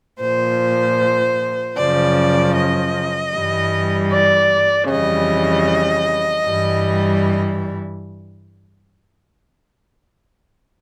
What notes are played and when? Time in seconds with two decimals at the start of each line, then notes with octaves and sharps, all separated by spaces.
0.21 A#2 F3 C5
1.77 F#2 C#3 F3 D5
2.55 D#5
3.34 G2 E3 G3
4.12 D5
4.90 F2 C#3 E3 G3 D#5
6.47 G2 E3 G3